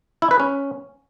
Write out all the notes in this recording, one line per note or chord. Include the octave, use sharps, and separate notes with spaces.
E4
B4
C#4